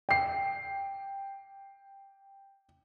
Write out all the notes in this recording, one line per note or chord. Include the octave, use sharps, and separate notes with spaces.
G5 C7